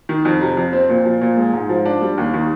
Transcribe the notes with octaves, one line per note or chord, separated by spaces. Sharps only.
D#3
F2
C3
F2
C4
A#2
F3
A#2
G#3
G#2
F3
D4
G3
D#2
D#3